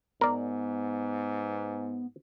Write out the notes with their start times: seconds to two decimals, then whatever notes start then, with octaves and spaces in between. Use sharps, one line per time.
0.21 G#2 B3 A#4 D5